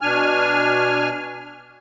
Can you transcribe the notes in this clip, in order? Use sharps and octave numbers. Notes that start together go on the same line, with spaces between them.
B2 D4 G#5 F6